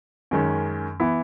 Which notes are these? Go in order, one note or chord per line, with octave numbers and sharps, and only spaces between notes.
F#2 D#3 G#3 C#4
E3 B3 E4